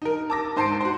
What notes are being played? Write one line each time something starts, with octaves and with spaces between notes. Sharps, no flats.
D#4 A#4
A5 D6 A#6
G#2 C5 A5 C6 C7 D7
F#4 C5